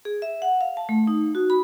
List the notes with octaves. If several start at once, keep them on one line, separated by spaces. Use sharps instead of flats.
G#4
E5
F#5
F5
A5
A3
D#4
F#4
B5